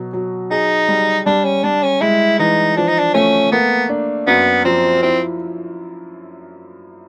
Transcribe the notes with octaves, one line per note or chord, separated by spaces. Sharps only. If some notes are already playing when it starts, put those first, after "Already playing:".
Already playing: B2 F#3
F#3
D#4 G#4
G3
G3 D4
C#4
G3 D4
C#4
G#3 E4
E3 D#4
F3 D4
D#4
D4
A3 C#4
A#3 B3
D4
F#2 B3
F3 C4
C4 E4